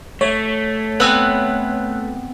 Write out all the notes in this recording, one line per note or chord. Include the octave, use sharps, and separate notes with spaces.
A3 C#5
B3 C4 B4 G#5 E6 F#6